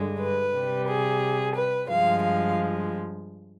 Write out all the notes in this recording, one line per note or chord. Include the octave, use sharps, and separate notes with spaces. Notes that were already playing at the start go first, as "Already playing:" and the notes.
Already playing: G2 D3 G#3
B4
C3 G3
G#4
B4
G2 F3 G#3 F5
F5